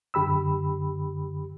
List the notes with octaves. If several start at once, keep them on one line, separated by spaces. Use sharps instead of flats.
F#2 D3 G4 B5 E6